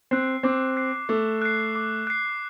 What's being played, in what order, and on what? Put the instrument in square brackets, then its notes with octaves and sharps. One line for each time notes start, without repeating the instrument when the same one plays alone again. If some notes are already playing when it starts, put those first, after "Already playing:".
[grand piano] C4 [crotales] F#6 C7
[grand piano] C4 [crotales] D6
[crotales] F#6 C7
[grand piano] A3 [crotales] D6
[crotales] F#6 C7
D6
F#6 C7